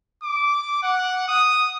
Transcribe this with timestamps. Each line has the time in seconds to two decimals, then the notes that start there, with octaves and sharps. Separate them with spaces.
0.23 D6
0.83 F#5
1.29 D#6